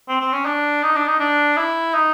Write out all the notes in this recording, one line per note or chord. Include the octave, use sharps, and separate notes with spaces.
C4
C4
C#4
D4
D#4
D4
D#4
D4
E4
D#4